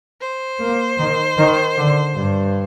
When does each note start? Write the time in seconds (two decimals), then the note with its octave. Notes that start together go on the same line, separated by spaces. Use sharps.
0.21 C5
0.60 A#3
0.98 D#3
1.37 D#3
1.76 D3
2.15 G2